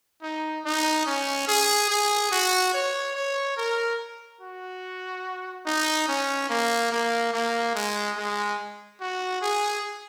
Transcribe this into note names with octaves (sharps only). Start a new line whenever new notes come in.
D#4
D#4
C#4
G#4
G#4
F#4
C#5
C#5
A#4
F#4
D#4
C#4
A#3
A#3
A#3
G#3
G#3
F#4
G#4